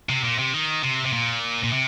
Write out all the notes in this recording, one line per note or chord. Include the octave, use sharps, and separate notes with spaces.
C3
A#2
C3
D#3
C3
C3
A#2
A#2
C3